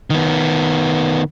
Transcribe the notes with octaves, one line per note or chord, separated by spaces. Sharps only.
D#3 B3